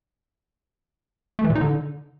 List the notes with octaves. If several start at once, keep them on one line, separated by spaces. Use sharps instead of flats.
A3
E3
A#2
D#4
D3